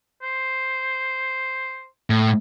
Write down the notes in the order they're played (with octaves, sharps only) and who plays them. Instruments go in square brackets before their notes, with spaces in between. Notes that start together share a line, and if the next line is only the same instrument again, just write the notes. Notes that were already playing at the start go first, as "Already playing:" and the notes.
[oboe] C5
[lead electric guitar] A2